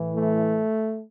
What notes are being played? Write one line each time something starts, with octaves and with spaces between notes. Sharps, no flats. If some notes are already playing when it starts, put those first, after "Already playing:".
Already playing: A2 E3
A3